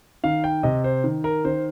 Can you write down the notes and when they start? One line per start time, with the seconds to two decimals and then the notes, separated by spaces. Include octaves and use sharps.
0.24 D#3 F5
0.44 G5
0.63 C3 D#5
0.84 C5
1.04 D#3
1.24 A#4
1.45 D#3 C5